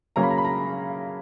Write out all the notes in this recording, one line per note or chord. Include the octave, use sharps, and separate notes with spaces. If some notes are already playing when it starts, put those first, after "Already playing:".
C#3 F#3 A#3 C#4 A#5
B5
A#5
B5
A#5